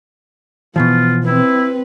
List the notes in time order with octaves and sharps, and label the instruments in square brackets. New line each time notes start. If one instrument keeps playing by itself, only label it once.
[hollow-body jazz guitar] B2 E3 F3 [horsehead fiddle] B3 [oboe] F4
[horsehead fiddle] C4 B4 [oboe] E4